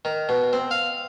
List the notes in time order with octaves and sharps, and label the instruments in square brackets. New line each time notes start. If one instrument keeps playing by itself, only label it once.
[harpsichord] D#3
B2
C4
F5